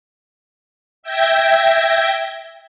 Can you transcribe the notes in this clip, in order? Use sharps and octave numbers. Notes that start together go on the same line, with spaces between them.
E5 G5 G6 G#6 A#6